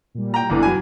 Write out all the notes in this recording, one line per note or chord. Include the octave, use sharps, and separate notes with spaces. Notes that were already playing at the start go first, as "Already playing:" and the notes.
A#2 G3
G5 A#5
G1 E2 D3 E3 B4
F#3 G#5